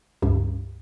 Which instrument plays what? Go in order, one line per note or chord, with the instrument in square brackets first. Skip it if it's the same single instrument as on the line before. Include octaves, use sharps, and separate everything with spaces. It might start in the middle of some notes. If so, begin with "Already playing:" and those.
[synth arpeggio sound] C#2 G2